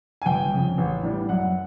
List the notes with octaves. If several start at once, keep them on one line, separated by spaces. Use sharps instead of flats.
G#5
G1 G5
F2 C#3
A1
A2 E3 G3
F#2 F#5